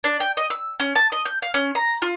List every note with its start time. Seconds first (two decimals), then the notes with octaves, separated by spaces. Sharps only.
0.04 D4
0.20 G5
0.37 D#5
0.50 E6
0.80 C#4
0.95 A5
1.12 D#5
1.25 G6
1.42 F5
1.54 C#4
1.75 A#5
2.02 F4